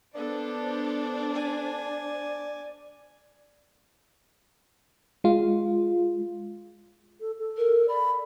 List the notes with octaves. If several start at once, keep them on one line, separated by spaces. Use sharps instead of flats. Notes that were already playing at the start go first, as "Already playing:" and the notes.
B3 D4 A4 C5 D5
G#5
G#3 F4
A4
A4
A#4
D5 B5